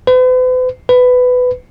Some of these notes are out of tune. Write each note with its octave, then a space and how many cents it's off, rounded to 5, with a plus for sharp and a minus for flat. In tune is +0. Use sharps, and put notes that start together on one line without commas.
B4 +45
B4 +15